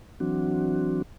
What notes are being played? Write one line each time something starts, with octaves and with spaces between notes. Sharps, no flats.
E3 F#3 C4 D4 F#4